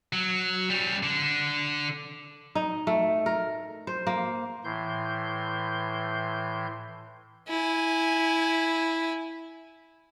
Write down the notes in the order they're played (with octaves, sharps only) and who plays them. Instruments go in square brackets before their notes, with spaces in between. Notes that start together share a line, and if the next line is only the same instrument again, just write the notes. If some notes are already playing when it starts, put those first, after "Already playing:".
[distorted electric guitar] F#3
G3 C#4
D3
[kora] D#4
A3
A#4
C5
A#3
[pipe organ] A2 E3 C6 G6
[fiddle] E4 G#5